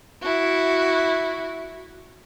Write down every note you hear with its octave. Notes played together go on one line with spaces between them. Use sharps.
E4 F#4